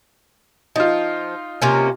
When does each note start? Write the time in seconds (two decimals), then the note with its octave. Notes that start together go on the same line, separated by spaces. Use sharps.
0.76 F3 D#4 F4
1.62 C3 A#3 C#4